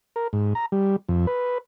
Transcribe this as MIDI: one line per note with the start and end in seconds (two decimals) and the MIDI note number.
0.16 0.28 70
0.33 0.54 44
0.55 0.66 82
0.72 0.96 55
1.09 1.26 41
1.27 1.58 71